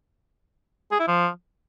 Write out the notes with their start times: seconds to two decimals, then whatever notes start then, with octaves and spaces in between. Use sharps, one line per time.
0.92 G#4
1.00 E4
1.08 F3